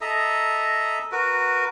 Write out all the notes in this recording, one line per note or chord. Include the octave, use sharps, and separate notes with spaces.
A4 D#5 E5 A#5
F#4 A#4 B4